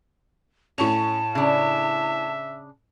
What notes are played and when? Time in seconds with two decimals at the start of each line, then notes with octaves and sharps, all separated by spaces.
0.78 A2 C#4 A5 C#6 F7
1.35 C#3 D4 E5